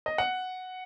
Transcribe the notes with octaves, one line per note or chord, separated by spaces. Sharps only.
D#5
F#5